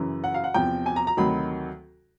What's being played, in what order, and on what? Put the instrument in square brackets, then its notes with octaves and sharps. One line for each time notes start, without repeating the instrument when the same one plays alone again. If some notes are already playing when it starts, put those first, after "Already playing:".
Already playing: [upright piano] F#2 C#3 E3
F#5
F5
F#5
E2 C3 F3 G5
G#5
A#5
A#5
D2 C3 D#3 F#3 B5